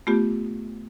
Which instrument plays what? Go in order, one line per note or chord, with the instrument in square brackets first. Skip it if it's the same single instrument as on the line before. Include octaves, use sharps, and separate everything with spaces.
[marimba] A3 B3 F4 G4